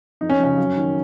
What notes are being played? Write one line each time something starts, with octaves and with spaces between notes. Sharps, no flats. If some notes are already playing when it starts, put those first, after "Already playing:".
F2 D#4
C#4
C#3 F3 C#4
F#2
D#3 F#3